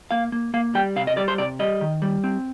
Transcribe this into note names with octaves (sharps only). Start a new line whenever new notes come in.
A#3 F5
A#3
A#3 F5
G3 G5
C3 F5
D#5
G3 D5
C5
C3 D5
G3 D#5
D#3
G3
C4